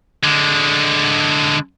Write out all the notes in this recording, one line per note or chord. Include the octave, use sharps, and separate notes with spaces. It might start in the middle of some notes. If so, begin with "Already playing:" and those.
D3 G#3